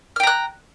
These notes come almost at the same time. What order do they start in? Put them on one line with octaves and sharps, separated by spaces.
F6 G5 A#5 F#6